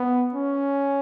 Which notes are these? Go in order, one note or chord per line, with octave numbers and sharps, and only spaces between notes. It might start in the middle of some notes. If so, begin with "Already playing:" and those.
Already playing: B3
C#4